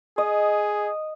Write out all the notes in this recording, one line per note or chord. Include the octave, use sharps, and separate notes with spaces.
G#4 D#5